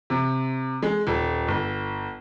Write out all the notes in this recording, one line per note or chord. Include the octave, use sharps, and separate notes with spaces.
C3
G#3
D#1
G1